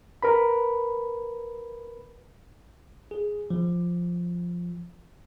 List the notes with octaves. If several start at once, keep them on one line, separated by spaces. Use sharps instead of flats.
A#4 B4 B5
G#4
F3